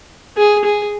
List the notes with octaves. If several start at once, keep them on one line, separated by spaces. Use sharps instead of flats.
G#4
G#4